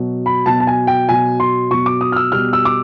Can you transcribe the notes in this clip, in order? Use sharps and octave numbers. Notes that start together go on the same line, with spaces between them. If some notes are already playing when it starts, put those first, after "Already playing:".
Already playing: B2 F#3
B5
B2 F#3 A5
A5
G#5
G5
B2 F#3 G#5
C6
B2 F#3 C#6
D6
D#6
F6
E6
B2 G3 F6
E6
D6